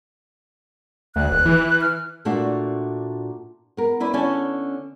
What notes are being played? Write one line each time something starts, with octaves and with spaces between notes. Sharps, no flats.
D2 F#6
D#1
E3
F6
A#2 A3 D4 F#4 E5 F5
B3 A#4
C#4 E4 B4 D5
D3 C#4 G#5 A5